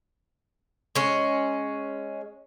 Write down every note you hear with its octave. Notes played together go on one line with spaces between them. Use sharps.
G#3 C#4